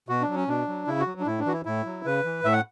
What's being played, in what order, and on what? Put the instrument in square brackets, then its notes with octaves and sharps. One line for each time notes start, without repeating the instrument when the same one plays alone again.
[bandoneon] B2 F#4
D4
F#3
C#4
B2 D4
F#3
C#3 E4
F#4
F#3
D4
A2 E4
D4
E3 F#4
E4
A2 E4
F#3
C#3 B4
E3
A2 E5
F#5